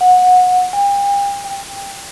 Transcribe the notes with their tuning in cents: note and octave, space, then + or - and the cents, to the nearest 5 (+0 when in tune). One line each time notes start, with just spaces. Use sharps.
F#5 -20
G5 +40
G5 +15